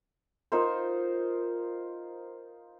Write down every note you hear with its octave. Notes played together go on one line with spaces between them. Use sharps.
D#4 F4 A#4 C5